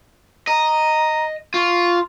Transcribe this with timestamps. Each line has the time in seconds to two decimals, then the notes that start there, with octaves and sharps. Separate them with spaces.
0.47 D#5 A#5
1.54 F4 C#6